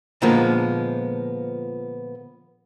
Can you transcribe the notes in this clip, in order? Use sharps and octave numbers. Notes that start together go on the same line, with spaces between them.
A#2 D3 F3 G#3 A#3 B3